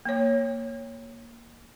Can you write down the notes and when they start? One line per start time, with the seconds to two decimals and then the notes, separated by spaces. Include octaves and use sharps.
0.05 A#3 C#5